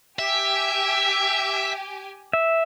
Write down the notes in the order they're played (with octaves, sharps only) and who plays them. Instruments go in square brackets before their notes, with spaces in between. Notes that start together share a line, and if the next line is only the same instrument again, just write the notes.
[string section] G4 G#5 [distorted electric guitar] E5
[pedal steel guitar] E5